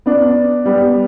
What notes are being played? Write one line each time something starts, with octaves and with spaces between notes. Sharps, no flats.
B3 D4
G3 B3